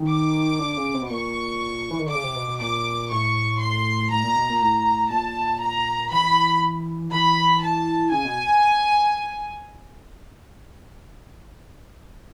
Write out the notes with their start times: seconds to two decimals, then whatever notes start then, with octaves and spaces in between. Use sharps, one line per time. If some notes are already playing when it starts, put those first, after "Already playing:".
Already playing: D#3
0.09 D6
0.59 D3
0.77 C#3
0.94 C3
1.02 B2
1.10 A#2 C#6
1.91 E3
1.99 D#3
2.06 D3
2.10 C#3 D6
2.23 C3
2.35 B2
2.48 B2
2.60 A#2 D6
3.11 A2 C#6
3.61 C6
4.10 A2 A#5
4.23 A#2
4.36 B2
4.49 A#2
4.61 A2 A#5
5.10 A#2 A5
5.61 A#5
6.11 E3 B5
7.12 E3 B5
7.62 A5
8.11 C#3 G#5
8.25 B2